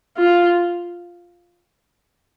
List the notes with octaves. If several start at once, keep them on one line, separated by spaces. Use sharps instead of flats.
F4